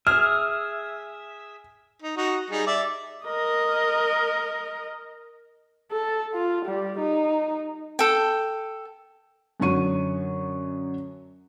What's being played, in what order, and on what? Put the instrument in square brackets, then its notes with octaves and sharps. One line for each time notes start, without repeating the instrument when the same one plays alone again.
[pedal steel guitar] G#4 E5 [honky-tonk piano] F6
[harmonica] D#4
D#4 F#4
G3 D#4 G#4
D5 E5
[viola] A#4 D#5
[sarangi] A4
F4
G3
D#4
[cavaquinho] A4 G5
[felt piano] F#2 D3 F#3 C#6 D#7